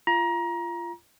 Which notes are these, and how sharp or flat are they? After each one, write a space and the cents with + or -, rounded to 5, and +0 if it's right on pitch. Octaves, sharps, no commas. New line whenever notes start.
F4 -25 A#5 +25